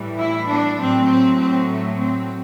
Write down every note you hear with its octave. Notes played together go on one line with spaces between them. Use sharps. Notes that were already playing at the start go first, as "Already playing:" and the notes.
Already playing: A2 E3 G3
E4
D4
A2 F#3 C4
C4
C4
A3
C4